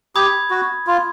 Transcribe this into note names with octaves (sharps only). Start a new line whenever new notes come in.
G4 B5 D#6 G#6
F#4
F4